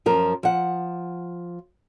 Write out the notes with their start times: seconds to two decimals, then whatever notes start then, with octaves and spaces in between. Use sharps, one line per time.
0.06 F#2 F3 A#4
0.43 F3 F#5